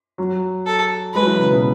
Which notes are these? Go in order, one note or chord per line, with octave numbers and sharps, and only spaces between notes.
F#3
A4
G#3 B4
F#3
E3
C#3
B2